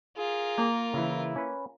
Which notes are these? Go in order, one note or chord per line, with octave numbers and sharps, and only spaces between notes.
F4 G#4 A#4
A#3
C#3 E3 E4
C#4 B4